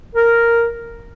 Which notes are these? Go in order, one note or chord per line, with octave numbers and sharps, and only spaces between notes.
A#4